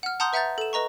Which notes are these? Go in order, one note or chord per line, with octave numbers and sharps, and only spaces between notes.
F#5 F6
F#5 A5 A#5 C6 D#6 G6
B4 E5 F#5 A#5 G6 A6
A4 E7
B4 D#5 A#5 C#6